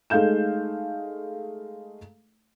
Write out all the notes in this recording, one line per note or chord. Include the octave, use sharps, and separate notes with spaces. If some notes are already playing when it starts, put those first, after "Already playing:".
G#3 A3 D#4 F5 G6 E7